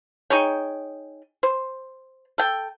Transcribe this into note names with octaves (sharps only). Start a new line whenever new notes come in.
D#4 G#4 C#5 G5
C5
A4 G5